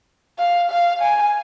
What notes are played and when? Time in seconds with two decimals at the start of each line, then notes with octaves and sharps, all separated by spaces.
0.39 F5
0.70 F5
1.01 G#5